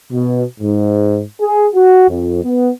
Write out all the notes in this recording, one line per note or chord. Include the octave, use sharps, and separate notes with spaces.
B2
G#2
G#4
F#4
F2
B3